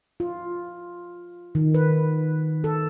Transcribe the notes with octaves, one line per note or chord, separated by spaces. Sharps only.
F4
D#3
B4
A4